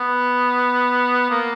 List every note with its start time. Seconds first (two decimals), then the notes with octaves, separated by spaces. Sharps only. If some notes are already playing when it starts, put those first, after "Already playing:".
Already playing: B3
1.30 A#3